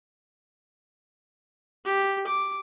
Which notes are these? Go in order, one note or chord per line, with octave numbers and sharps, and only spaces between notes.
G4
D6